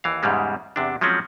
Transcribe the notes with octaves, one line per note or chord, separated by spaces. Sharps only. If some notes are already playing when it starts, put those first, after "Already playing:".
D#2 E3 F5
E2 G#2 C#3 G3 G#3
E2 C3 D4
F3 F#3 G#3 C4 C#4